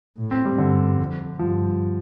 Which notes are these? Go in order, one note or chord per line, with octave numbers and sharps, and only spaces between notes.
A2
C4
G3
G2 D3
F2
G2 F3